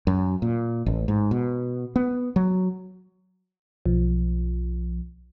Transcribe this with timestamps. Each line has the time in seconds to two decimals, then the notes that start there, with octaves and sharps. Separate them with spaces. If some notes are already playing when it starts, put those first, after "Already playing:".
0.07 F#2
0.42 A#2
0.86 A1
1.08 G#2
1.31 B2
1.96 B3
2.36 F#3
3.85 B1 F3